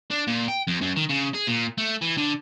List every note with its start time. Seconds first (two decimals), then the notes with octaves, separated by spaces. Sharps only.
0.10 D4
0.27 A#2
0.48 G5
0.67 F2
0.82 F#2
0.97 D#3
1.09 C#3
1.34 G#4
1.47 A#2
1.78 A3
2.02 E3
2.18 D3